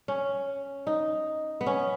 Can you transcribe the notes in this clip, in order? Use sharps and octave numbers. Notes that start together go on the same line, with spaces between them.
C#4
D#4
B3
C#4